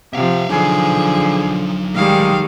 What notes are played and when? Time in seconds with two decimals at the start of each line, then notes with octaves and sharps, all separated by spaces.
0.13 C3 F3 E5 F5
0.50 D3 F3 F#3 D#4 G#4
1.95 D#3 G3 G#3 F5